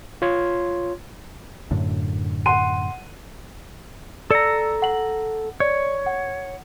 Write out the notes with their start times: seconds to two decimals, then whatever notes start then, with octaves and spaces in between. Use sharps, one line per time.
0.22 F4 C#5 C6 G#6
1.71 F#2 A2 D3
2.46 F#5 C6 D#7
4.31 A4 D5 A#5 E6 C#7
4.82 F#5 F#7
5.60 C#5 D5
6.06 F#5